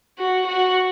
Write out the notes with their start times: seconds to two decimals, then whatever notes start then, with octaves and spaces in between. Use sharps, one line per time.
0.19 F#4
0.47 F#4